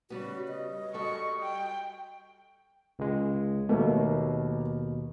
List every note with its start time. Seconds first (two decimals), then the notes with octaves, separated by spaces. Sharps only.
0.10 C#3 G3 B3 F#4
0.48 D#5
0.94 G3 F#4 A4 C#6
1.42 G5
2.99 C#2 G#3
3.69 D#2 B2 A3 A#3